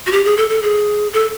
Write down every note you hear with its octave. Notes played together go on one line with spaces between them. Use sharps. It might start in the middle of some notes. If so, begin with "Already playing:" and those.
F#4
G4
G#4
A4
A4
G#4
A4